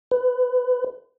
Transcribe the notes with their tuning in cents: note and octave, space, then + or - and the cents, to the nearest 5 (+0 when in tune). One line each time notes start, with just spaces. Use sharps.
B4 +25